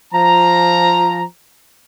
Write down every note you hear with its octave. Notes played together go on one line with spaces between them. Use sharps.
F3 A#5